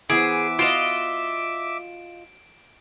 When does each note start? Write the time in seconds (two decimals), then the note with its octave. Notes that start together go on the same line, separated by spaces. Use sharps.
0.10 E3 B3 G#4 C5 E5 D6 D7
0.59 F4 F#4 D#5 F5 D7 E7